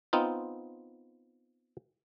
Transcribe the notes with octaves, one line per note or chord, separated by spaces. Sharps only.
B3 C4 D#4 F4